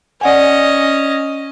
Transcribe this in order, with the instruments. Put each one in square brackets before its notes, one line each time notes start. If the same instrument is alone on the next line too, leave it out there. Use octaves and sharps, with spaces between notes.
[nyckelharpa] C#4 D#5 [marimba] D5 F#5 G#5